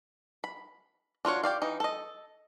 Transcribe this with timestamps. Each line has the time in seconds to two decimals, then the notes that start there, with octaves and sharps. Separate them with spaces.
0.44 B5
1.25 D4 F4 F#4 C#5
1.43 G4 D5 F5
1.62 E3 D#4
1.80 A4 D#5